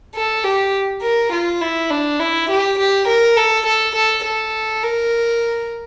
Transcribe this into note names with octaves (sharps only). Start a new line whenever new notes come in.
A4
G4
A#4
F4
E4
D4
E4
G4
G4
A#4
A4
A4
A4
A4
A#4